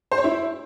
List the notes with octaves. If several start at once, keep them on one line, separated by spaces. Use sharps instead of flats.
C5
C#5
E4